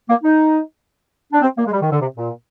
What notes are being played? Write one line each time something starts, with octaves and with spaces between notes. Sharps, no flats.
A#3
D#4
D4
C4
A#3
G#3
G3
D#3
D3
C3
A#2